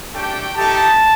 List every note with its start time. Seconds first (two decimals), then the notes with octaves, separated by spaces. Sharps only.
0.13 A3 D4 G4 G5
0.54 A3 D#4 G4 A5